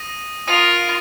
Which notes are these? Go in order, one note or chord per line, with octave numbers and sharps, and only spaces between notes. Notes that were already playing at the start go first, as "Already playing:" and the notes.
Already playing: D#6 A#6 D#7
F4 A#4 D#6 A#6 D#7